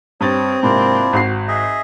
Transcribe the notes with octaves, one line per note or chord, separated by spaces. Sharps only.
G2 C4 C#5 D#6 A6
G#2 C3 A#3 D4 E4 F4
G#1 F#4 C7
G#4 D#5 E5